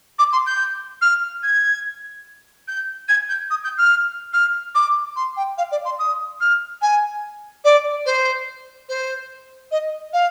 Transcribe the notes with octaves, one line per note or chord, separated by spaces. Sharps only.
D6
C6
G6
F6
G#6
G6
G#6
G6
D#6
G6
F6
F6
D6
C6
G5
F5
D5
C6
D#6
F6
G#5
D5
C5
C5
D#5
F5